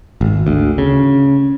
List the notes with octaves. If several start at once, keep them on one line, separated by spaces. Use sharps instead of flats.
G#1
D2
C#3